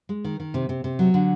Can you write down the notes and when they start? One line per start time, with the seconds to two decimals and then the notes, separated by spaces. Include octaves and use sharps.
0.09 G#3
0.25 D#3
0.40 D#3
0.54 C3
0.69 C3
0.84 C3
0.99 F#3
1.14 D3